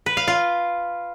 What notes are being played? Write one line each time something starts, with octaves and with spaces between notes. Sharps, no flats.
B4
F5
F4